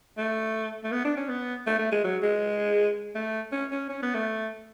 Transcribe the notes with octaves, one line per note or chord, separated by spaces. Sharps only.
A3
A3
B3
D4
C#4
B3
A3
A3
G#3
F#3
G#3
A3
C#4
C#4
C#4
B3
A3